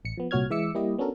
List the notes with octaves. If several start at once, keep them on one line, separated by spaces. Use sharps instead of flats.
A1 C#7
F3 B3
C2 A#2 F#4 C#5 F6 G#6
E3 G#3 E5 D6 E6 C#7
G3 A#3 E4 G4 D#5
B3 C#4 D4 F#4 A4 A#4